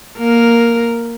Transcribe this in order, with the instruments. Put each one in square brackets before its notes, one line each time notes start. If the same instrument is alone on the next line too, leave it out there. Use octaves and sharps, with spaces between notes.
[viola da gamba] A#3 A#4